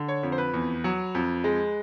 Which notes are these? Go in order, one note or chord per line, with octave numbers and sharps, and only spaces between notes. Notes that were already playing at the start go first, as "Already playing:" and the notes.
Already playing: D3
C#5
F2
C5
B4
E2
F#3
F2
G#3